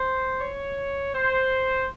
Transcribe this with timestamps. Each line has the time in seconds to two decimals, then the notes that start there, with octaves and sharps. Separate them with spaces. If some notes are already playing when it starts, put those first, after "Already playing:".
Already playing: C5
0.39 C#5
1.14 C5